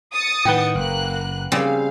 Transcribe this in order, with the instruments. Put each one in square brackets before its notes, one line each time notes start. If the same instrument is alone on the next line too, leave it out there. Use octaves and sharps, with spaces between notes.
[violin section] D#6 A6 C#7
[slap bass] A2 D#3 [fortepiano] B4 F#5 G5
[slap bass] F#1 [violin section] A#3 F#6
[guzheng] C#3 G3 C4 [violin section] F5